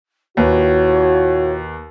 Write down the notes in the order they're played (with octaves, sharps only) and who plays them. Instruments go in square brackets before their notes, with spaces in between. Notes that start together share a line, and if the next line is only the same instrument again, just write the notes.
[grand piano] D#2 B4 [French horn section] A#2 E4 F#4 [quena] C#5